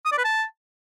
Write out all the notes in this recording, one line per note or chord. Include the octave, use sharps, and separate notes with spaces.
D#6
D5
B4
A5